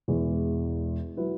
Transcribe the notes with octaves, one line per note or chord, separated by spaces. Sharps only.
E1 E2 E3 G#3
F#3 E4 B4